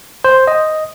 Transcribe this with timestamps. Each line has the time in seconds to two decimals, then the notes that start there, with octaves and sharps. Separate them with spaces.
0.24 C5
0.47 D#5